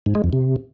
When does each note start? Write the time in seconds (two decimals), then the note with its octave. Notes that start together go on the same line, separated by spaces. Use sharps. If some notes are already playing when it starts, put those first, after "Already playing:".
0.06 G#2
0.15 G#3
0.24 F2
0.33 C3